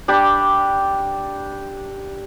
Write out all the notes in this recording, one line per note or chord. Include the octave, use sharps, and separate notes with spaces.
D4 G4 B5